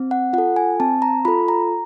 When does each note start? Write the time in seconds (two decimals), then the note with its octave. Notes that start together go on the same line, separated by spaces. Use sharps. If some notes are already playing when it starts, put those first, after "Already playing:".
Already playing: C4
0.11 F#5
0.33 F4 A4 F#5
0.56 G#5
0.80 C4 A5
1.02 A#5
1.25 F4 A4 B5
1.48 A#5